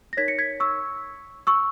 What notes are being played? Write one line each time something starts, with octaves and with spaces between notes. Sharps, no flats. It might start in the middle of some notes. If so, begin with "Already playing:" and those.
A#6
D#4 A#4 C#5 G#6 B6
A#6 C#7
G#6 B6
C#6 E6
C#6 E6